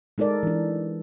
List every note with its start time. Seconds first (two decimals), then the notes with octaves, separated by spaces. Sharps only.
0.18 G#3 D#4 A4 A#4 D5
0.43 E3 D4